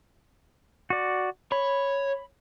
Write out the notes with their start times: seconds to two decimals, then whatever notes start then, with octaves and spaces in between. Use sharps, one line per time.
0.90 F#4 D5
1.52 C#5 B5